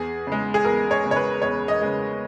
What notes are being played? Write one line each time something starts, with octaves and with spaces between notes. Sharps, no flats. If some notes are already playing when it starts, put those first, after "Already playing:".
Already playing: E2 G#4
C#3 G#3
G#4
E2 A#4
C#5
C#3 G#3
C#5
B4
E2 C#5
D#5
C#3 G#3